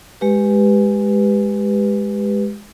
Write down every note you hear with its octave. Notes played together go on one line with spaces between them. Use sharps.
G#3 G4 B4